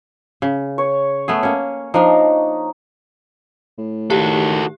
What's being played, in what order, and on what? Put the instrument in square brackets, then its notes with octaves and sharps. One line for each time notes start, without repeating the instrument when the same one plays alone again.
[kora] C#3
[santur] C#5
[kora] A3 B3 G#4
A#3 C#4
[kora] F3 D4 F5 [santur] D#4
[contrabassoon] A2
[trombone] D#3 [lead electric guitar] F#4 A4 [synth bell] G4